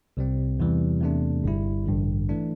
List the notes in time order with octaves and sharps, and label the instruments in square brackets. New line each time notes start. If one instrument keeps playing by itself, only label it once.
[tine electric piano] C2 C3 G3 C4
E2 C3 E3 G3
E2 C3 A3 D4
G1 G2 G3 E4
A1 G2 D3
E3 A3 D4